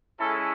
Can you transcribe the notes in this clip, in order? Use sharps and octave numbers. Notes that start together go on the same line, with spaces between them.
G#3 C#4 E4 A4